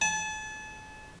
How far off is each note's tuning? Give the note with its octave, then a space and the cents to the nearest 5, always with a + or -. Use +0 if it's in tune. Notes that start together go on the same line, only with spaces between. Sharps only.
A5 -35